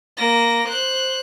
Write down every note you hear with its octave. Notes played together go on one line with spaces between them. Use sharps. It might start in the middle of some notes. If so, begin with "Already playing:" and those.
A#3 A#6
C5 F#6